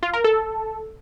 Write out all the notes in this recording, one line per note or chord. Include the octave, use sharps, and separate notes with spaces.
F4
A#4
A4